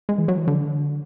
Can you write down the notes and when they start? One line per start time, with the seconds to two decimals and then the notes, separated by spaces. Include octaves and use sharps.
0.09 G#3
0.18 E3
0.28 F#3
0.38 E3
0.48 D3